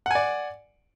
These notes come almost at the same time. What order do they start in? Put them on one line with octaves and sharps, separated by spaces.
F#5 G#5 D5